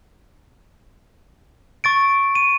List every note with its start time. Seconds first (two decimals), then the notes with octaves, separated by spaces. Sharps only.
1.84 C#6 A6 D7
2.35 D#7